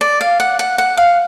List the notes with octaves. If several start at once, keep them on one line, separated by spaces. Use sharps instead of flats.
D5
F5
F#5
F#5
F#5
F5